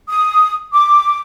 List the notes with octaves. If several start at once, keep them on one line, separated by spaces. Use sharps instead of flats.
D#6
D6